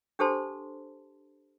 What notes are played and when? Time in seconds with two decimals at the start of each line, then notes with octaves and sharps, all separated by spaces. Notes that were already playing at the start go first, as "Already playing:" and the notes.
0.19 D4 G4 A4 C5 A5 C6